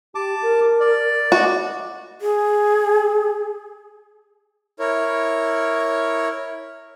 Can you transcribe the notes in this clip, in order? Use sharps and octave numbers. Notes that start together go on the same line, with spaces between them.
G4 A5 D6
A#4
D5
F#4 D#5
G#4
E4 A#4 C#5